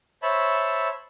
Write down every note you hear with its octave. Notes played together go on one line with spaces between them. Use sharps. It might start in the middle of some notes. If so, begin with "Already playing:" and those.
C5 C#5 E5 A5 B5